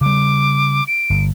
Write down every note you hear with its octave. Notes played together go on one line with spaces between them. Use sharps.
C#3 G3 D6
D7
G1